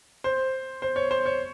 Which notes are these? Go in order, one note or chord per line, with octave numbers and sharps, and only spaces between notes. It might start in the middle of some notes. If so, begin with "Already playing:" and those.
C5
C5
C#5
C5
C#5